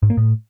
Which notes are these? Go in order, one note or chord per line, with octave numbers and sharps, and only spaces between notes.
G#2
A#3
A2